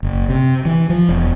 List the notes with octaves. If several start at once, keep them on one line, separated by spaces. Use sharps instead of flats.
F#1
C3
E3
F3
E1